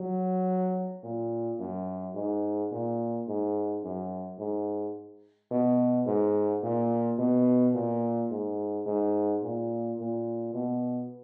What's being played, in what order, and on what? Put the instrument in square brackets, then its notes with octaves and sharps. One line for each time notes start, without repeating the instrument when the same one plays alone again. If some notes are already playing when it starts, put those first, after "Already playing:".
Already playing: [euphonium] F#3
A#2
F#2
G#2
A#2
G#2
F#2
G#2
B2
G#2
A#2
B2
A#2
G#2
G#2
A#2
A#2
B2